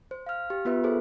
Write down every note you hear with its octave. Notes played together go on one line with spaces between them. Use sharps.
C5
F5 F6
G4
B3 F4 B4 E5
G#4 A4 C5